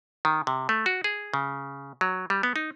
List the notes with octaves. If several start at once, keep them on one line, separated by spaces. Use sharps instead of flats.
D#3
C3
A3
F#4
G#4
C#3
F#3
G3
B3
D#4